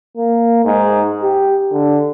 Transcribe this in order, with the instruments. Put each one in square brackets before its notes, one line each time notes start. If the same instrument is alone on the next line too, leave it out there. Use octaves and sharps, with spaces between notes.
[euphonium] A#3
G#2
G4
D3